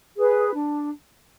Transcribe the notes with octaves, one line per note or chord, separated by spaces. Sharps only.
G#4 B4
D4